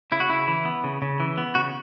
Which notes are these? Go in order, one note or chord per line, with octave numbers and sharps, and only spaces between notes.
C#3 E4
F#4
C#3 E4
E3
B3
C#3
C#3
E3
B3
C#3 F#4